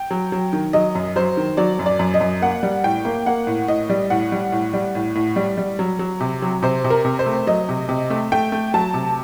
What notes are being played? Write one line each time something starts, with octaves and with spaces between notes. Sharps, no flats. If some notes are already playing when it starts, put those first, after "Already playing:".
Already playing: G5
F#3
F#3
D#3
F#3 D#5
F#2
F#3 C5
D#3
F#3 D5
F#2
D5
F#2
D#5
F#2
A#3 F#5
G3
A2 G5
A#3
A#3 F#5
A2
A2 D#5
G3
A2 F#5
G3
A2
G3
A2
A2
G3
G3
F#3
F#3
C3
F#3
C3 C5
C3
A#4
C3
C5
A3
F#3 D#5
C3
C3
A3
A3 G5
A3
F#3 A5
C3